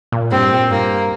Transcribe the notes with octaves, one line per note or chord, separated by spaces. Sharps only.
A#2
G2 C4
A#2
G2 A#3